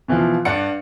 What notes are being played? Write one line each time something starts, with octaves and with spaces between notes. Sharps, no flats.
B2 E3 F3 F4
G2 D5 F#5 C#7